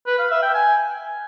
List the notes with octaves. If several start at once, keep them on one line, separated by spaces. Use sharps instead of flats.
B4
F5
E5
G5
G#5